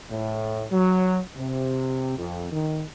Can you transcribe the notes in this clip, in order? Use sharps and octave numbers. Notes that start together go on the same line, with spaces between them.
A2
F#3
C3
F2
D#3